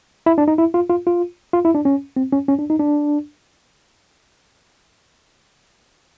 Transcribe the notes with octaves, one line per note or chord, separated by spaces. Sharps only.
E4
D4
D#4
E4
F4
F4
F4
F4
E4
D4
C#4
C4
C#4
C#4
D4
D#4
D4